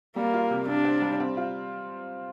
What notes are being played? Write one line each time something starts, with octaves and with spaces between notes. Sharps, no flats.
G3 A#3
F4
C3
C3 D4
C4
G3
C4
F4